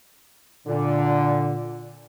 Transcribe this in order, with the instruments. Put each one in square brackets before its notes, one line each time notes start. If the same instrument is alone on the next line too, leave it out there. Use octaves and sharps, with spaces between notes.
[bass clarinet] A#2 [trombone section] D3